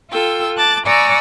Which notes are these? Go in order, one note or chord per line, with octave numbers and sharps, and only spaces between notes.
F4 A4 G5 E6
A5 D6 F#6 A6
D5 F#5 G#5 A#5 C#6 E6